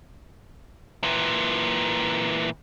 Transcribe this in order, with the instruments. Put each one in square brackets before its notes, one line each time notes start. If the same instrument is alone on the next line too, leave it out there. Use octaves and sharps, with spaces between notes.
[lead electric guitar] A#2 E3